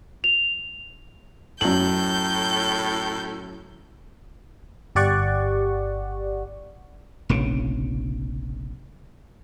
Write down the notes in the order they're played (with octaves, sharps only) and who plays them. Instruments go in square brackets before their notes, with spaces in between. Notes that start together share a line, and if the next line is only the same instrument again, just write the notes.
[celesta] F7
[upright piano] F#2 F#7 [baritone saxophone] A2 [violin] G6
[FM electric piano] G1 G4 D5 F#5 C#6
[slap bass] F1 A#1 C#3